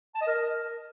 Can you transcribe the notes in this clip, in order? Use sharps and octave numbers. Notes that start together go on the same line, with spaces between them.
A5
D#5
A#4